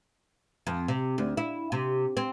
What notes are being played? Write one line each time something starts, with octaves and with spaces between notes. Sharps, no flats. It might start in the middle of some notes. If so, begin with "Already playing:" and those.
F2
C3
D2
E4
C3
C4